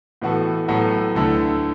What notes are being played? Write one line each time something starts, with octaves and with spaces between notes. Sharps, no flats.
A2 E3 B3 F#4 A4
A2 F#3 B3 F#4 A4
D2 D3 A3 E4